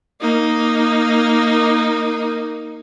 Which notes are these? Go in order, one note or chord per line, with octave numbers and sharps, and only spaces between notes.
A#3 D#4